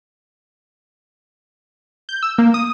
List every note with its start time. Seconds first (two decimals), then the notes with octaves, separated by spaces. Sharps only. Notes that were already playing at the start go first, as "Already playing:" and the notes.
2.09 G6
2.23 E6
2.38 A#3
2.54 D#6